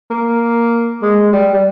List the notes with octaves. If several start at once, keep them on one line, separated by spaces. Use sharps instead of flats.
A#3
G#3
G3
G3